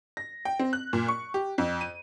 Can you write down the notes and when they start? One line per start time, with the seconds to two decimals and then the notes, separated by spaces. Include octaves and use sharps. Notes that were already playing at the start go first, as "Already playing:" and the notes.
0.17 A#6
0.45 G5
0.59 C4
0.73 F#6
0.93 A#2
1.08 C#6
1.34 G4
1.58 F2
1.81 D#7